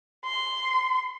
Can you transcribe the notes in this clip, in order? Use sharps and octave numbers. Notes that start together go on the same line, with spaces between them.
C6